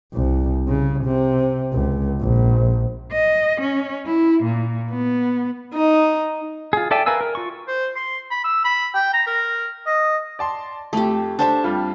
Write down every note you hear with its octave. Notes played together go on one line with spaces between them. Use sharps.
C2
C#3
C3
C#2
A#1
D#5
C#4
E4
A#2
B3
D#4
F4 G#4
A4 D5 E5 G5 G#5
A#4 B4 F5 G#5 E6
A#4
F4 C#6
C5
C6
B5
E6
B5
G5
A#5
A#4
D#5
D5 A5 C6
F2 A3 G4
D4 A4 C5 E5 A5
F2 G3 F4